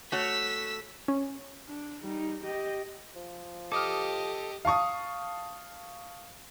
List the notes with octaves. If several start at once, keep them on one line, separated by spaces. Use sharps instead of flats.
A3 F#4 C#5 E6 B6
C#4
D4
G3 D#4
G4 D#5
F3
G4 A4 D#5 D6 D#6 F6
F5 A5 C#6 D#6